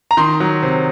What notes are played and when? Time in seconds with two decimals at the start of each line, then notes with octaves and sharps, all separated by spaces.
0.11 A#5
0.17 D#3 C6
0.40 F#3
0.63 C3